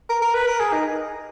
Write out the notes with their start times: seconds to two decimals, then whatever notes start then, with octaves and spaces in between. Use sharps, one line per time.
0.09 A#4
0.22 A#4
0.35 B4
0.47 A#4
0.59 G#4
0.73 D#4